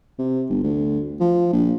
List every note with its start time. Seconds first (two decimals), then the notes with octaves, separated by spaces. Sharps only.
0.19 C3
0.50 G1
0.64 D2
1.20 F3
1.53 A#1